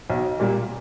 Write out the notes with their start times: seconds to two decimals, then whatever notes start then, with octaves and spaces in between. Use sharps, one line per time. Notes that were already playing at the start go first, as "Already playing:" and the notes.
0.10 B1
0.40 A#2 G3 A#3